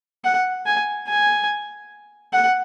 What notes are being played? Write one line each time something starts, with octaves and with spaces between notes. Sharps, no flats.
F#5
G#5
G#5
F#5